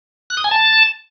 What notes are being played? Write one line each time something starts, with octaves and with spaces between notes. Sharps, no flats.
F#6
D#6
G#5
A5